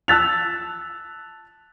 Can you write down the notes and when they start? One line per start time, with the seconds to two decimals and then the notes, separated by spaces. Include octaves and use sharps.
0.08 A5 E6 F#6 A6 B6 F7